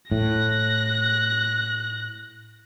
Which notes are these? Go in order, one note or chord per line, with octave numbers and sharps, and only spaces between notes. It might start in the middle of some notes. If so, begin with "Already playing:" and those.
A2 F#6 A#6